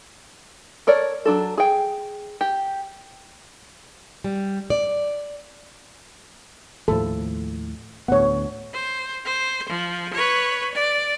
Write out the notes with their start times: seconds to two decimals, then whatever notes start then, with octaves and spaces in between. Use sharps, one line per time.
0.87 A4 A#4 C#5 D5
1.25 F#3 D4 A4
1.58 G#4 G5
2.41 G4
4.24 G3
4.70 D5
6.88 D#2 A2 F3 A4
8.08 D2 A2 B3 C#5 F#5
8.73 C5
9.25 C5
9.69 F3
10.14 B4 C#5
10.75 D5